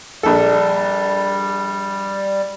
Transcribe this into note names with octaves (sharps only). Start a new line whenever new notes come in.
A#1 G3 A4